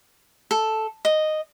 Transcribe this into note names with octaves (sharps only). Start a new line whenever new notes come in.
A4
D#5